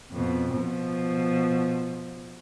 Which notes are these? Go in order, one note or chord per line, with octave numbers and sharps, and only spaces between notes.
F2 B2
B2 F3